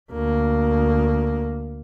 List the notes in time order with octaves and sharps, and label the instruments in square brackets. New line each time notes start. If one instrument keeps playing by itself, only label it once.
[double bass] D2 A#3